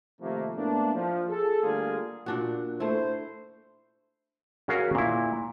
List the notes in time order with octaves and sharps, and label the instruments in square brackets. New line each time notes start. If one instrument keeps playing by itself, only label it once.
[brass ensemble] C3 D#3 F3 A3 A#3
A2 A#3 B3 D4
F3
G#4 A4
D3 G3 A3 A#3 F4 G#4
[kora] A#2 D4 F#4
[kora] A3 E4 [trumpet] C5
[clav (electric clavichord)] C#4 F#4 G#4 A#4 F5
A#2 E4